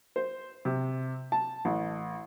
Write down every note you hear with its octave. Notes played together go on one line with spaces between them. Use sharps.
C5
C3
A5
A1